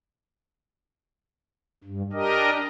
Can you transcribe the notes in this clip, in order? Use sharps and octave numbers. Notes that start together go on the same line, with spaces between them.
G2
D4 G4 A#4 D#5